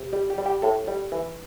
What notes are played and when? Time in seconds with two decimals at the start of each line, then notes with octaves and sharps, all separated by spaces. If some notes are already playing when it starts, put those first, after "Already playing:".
Already playing: C3
0.13 G3 G4
0.30 G4
0.38 G3
0.46 G4
0.62 A2 A4
0.88 G3
1.12 E3